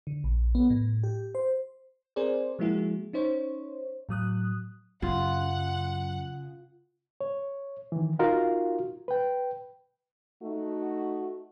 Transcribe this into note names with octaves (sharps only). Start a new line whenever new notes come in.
D3
A#1
B3
A2
G4
C5
C4 G#4 A#4 C5 D5
F3 G#3 A#3 E4 F#4 G#4
C#4 D#4 C5 C#5
A2 F#3 D#6 F#6
F#2 C#3 F4 F#5
C#5
D#3 E3
D#4 F4 F#4 A#4 F5
B4 G5
A3 D#4 F#4